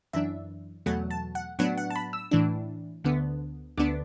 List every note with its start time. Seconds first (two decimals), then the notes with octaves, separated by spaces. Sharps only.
0.13 F#2 E3 D4 E5
0.86 E2 B2 F#3 A3 F#5
1.11 A5
1.35 F#5
1.59 A2 F#3 B3 D4 F#5
1.78 F#5
1.90 A5
1.96 B5
2.13 E6
2.31 A2 E3 D4
3.04 D2 D3 B3
3.78 D2 D3 B3 D4 D6